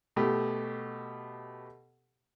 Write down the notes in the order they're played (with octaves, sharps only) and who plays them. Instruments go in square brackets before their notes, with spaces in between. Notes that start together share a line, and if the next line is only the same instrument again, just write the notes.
[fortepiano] B2 A3 G4